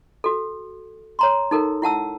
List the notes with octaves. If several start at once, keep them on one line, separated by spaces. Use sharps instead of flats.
F#4 A4
C#5 A#5 C6
D#4 A4 A#4
E4 F#5 A5 E6